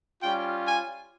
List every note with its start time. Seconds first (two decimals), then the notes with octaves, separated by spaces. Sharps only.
0.21 G3 C#4 F4 G5
0.64 G#5